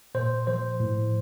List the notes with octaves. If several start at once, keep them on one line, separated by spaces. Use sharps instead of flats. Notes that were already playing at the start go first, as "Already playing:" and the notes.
A#2 C5
F3 C5
A2